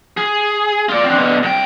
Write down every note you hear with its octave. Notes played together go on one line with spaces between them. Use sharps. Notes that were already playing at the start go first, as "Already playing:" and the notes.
G#4
F4 D5
C4 D4
B2 D3
C2 G5